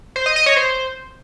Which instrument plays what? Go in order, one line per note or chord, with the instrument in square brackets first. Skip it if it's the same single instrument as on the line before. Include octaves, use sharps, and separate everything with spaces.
[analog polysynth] C5
D#5
D#5
C#5
C5